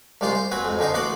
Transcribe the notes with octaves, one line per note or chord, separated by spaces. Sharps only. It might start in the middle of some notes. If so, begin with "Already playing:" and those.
C2 G3 G#3 F4 C5 C6
C5
C4 F#4 B4 G#5
F2 G#2
F2 D3 D#4 C5 D#5
A1 B3 F#4 F#5 C6 D6